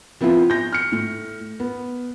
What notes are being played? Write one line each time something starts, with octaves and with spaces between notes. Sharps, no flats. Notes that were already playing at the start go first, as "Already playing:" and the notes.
F3 B3 C4 E4 F4
G6 A#6
F6 C#7
A2
B3